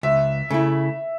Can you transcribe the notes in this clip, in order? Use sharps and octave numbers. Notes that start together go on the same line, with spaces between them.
C#2 E5
C#3 A3 E4